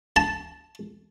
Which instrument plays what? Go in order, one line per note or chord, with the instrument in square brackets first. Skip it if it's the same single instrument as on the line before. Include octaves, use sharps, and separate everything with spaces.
[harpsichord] A5